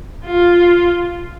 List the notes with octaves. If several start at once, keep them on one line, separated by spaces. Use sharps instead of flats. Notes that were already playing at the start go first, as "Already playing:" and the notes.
F4